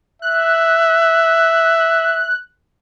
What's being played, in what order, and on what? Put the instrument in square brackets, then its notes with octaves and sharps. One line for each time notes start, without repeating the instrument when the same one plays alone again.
[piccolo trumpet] E5 [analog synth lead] F#6